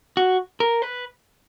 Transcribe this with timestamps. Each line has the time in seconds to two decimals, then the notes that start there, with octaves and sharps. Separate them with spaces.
0.17 F#4
0.60 A#4
0.82 B4